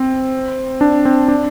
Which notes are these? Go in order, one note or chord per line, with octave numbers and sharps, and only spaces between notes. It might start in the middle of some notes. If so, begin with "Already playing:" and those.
Already playing: C4
D4
C4
D4